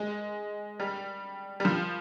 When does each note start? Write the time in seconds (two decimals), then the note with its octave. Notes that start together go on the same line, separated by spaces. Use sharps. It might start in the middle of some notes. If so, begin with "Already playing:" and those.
Already playing: G#3
0.80 G3
1.60 G3
1.65 F3